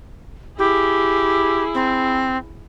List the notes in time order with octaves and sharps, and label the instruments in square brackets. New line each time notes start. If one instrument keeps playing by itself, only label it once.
[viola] E4 G#4 [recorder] G4
[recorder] C4